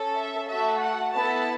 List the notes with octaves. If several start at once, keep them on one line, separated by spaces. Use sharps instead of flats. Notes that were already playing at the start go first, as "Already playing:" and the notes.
Already playing: C#4 A4
E5
A3 F#4 A4 E5
F#5
B3 E4 A4 A5